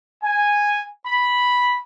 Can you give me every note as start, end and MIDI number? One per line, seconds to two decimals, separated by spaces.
0.23 0.84 80
1.05 1.79 83